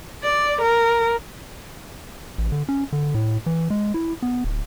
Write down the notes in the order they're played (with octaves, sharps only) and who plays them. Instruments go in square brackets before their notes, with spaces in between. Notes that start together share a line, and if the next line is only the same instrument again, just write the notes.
[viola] D5
A#4
[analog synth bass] A1
D3
C#4
D3
A2
E3
G#3
E4
B3
D1